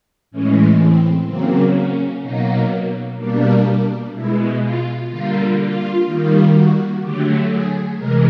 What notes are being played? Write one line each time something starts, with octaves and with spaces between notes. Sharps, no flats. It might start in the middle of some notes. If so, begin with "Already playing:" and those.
A2 E3 G#3 C#4
C4
C#3 F#3 A#3 C4
C#4
B2 F#3 A#3 D#4
B2 G3 A#3 D4
B2 G#3 E4
F4
D3 G3 A#3 F4
F4
D#3 G3 A#3
F#4
D3 F#3 A3 G4
G#4
C3 E3 G#3 A#4